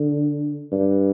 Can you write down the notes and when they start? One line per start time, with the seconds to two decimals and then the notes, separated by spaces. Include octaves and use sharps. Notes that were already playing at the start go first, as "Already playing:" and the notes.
Already playing: D3
0.72 G2